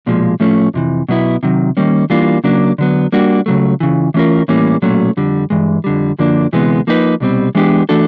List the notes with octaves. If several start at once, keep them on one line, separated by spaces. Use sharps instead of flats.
B1 A#2 F3 G#3
A2 F3 A3 C#4
F2 C3 E3
B2 F#3 B3 E4
C3 D#3 F#3
D#3 G3 A#3 C#4
E3 G3 A#3 D4 F4
C#3 F#3 A#3 D4
D3 F#3 B3
G3 A#3 D4 F#4
C#2 C#3 F#3 A3
C#2 C#3 E3
E3 A3 C#4 F4 A#4
A2 E3 G3 A#3 C#4
B1 A#2 F#3 A3 C#4
F2 D3 G3
G2 E3 G#3
F2 D3 G3
F#2 D3 F3 A#3 D4
D2 C3 E3 G#3 B3
F3 A#3 D#4 F#4 B4
C2 B2 G3 C4
E3 G#3 B3 D4 G4
E3 A3 D4 F#4 A4